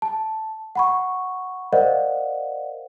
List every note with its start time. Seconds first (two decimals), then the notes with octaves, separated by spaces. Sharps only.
0.02 A5
0.75 F#5 B5 C#6
1.73 A#4 C5 D5 D#5 F5 F#5